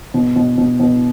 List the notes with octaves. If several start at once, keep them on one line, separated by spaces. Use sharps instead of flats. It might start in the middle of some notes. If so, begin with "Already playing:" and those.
B2
B2
B2
B2